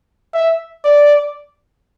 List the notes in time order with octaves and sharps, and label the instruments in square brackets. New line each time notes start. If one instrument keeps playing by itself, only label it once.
[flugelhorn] E5
D5